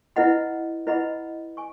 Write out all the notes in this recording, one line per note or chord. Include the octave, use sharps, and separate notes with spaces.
E4 B4 D#5 F#5 B5
E4 B4 D#5 F#5 B5
G#5 C#6